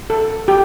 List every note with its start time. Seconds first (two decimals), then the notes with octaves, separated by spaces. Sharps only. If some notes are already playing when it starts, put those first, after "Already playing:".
0.10 A4
0.48 G4